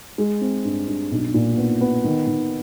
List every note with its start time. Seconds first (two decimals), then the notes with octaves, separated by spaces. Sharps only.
0.18 G#3
0.41 C4
0.65 G2
0.88 G2
1.11 B1
1.34 A#2
1.58 B3
1.81 B3
2.04 D#3
2.27 D#3